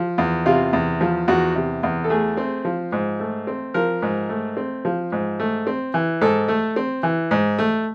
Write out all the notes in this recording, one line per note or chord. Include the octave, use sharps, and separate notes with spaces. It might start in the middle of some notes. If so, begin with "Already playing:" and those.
Already playing: F3
E2
C3 F4
E2
F3
E2 F#4
C3
E2
A4
A3 G#4
C4
F3
G#2
A3
C4
F3 A#4
G#2
A3
C4
F3
G#2
A3
C4
E3
G#2 A4
A3
C4
E3
G#2
A3